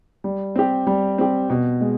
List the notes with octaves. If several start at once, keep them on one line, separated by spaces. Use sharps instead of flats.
G3
C4 G4
G3
C4 G4
B2
G#3